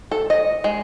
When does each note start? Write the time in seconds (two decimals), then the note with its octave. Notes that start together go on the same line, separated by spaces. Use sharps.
0.11 A4
0.30 D#5
0.64 G#3